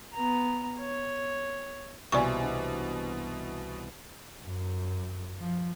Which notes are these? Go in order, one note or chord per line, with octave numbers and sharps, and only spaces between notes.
B3 A#5
C#5
C2 B2 E3 A#3 D5 G#5 C#6
D4
F#2
F3